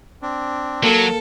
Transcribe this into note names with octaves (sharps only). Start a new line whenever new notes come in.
C4 D4
F#3 A#3 A4